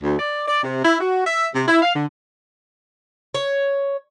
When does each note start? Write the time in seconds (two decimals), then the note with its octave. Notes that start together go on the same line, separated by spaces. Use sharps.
0.02 D2
0.18 D5
0.46 D5
0.62 C3
0.82 E4
0.99 F#4
1.25 E5
1.52 C3
1.67 E4
1.82 F5
1.94 D3
3.34 C#5